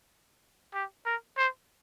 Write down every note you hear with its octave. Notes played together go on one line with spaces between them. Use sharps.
G4
A#4
C5